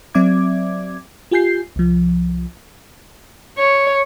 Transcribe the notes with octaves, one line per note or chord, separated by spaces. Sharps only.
F#3 C4 D5 E5 D6 G#6
F4 G4 G#5 G6 C7
C2 F3
C#5